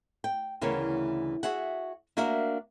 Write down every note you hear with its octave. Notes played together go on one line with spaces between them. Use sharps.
G5
D2 C#3 E3 B3 A#4 C#5
F#4 G#4 E5 F#5
A#3 D4 F#4 A#4 E5 F5